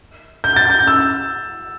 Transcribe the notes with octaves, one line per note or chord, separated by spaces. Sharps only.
G6
A6
G6
E6